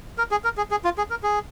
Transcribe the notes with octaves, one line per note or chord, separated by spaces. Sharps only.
A#4
G#4
A#4
G#4
G#4
F4
G#4
A#4
G#4